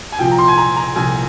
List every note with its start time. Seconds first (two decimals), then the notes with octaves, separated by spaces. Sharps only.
0.12 G#5
0.19 C2 A#2 F3 G5
0.31 A#5
0.39 C6
0.48 G#5
0.57 A#5
0.76 A#5
0.96 C2 A#2 F3 G#5